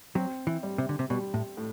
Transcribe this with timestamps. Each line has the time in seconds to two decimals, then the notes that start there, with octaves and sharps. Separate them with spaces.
0.15 F#3 C4
0.47 E3
0.63 G3
0.78 C3
0.89 D3
0.99 C3
1.10 B2 G3
1.34 A2
1.57 A2